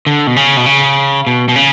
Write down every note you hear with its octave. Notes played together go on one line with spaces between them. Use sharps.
D3
B2
C#3
B2
C#3
B2
B2
C#3